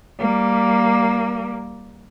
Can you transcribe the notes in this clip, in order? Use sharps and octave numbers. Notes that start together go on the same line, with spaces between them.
G3 A#3